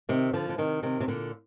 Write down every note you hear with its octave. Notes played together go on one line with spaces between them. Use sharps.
C3 D#3
D3 F3
D3
C3 D#3
C3 D#3
C3
A#2 D3